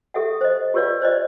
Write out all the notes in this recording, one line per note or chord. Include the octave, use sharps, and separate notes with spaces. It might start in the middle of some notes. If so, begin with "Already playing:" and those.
G4 A4 E5 F#5
C5 D#5
F4 G4 B4 C#5 D5 F5
C5 D5 D#5